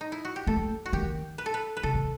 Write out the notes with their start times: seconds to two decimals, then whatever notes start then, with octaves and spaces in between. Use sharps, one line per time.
0.01 D#4
0.12 E4
0.25 F#4
0.36 G4
0.47 A3 A4
0.86 F#4
0.93 D#3 G4
1.38 B4
1.46 A4
1.54 B4
1.77 B4
1.83 C3 A4
1.95 D#3